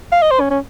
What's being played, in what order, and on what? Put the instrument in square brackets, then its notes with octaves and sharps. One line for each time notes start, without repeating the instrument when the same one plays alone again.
[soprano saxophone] F5
D#5
C5
C#4
C#4